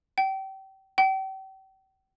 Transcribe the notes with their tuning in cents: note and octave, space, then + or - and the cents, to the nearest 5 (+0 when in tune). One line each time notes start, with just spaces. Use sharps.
G5 -30
G5 -40